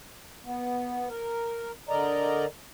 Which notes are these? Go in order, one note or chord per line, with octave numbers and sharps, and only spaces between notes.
B3
A#4
D3 A#4 D5 D#5 A#5